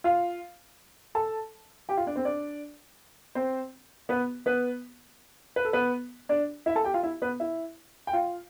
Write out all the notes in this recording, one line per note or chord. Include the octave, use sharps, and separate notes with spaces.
F4 F5
A4 A5
G4 G5
F4 F5
D4 D5
C4 C5
D4 D5
C4 C5
B3 B4
B3 B4
B4
A4
B3 B4
D4 D5
E4 E5
A4 A5
G4 G5
F4 F5
E4 E5
B3 B4
E4 E5
G5
F4 F5